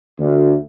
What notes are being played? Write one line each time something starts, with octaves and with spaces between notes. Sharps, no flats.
D2